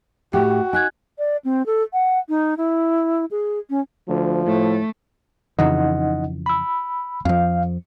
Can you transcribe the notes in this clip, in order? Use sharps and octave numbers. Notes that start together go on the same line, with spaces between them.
A2 F#4 G4 G5
D#4 G#5 F#6 G#6
D5
C4
A4
F#5
D#4
E4
G#4
C#4
D2 F3
A2 A3
F2 C#3 E3 D#4 D#5 F#5
B5 E6
F2 F3 F5